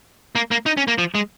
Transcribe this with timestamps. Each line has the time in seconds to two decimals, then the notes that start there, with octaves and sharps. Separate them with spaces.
0.35 A#3
0.51 A#3
0.66 D#4
0.77 C#4
0.88 A#3
0.98 F3
1.15 G#3